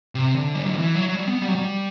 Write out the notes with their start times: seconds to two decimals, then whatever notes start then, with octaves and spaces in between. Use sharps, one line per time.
0.15 C3
0.35 D3
0.55 G3
0.64 F#3
0.74 E3
0.95 F#3
1.09 F#3
1.15 G3
1.27 B3
1.42 G3
1.48 F#3
1.55 G3